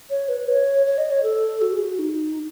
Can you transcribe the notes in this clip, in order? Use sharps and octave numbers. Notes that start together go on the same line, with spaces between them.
C#5
B4
C#5
C#5
D#5
C#5
A4
F#4
G#4
F#4
D#4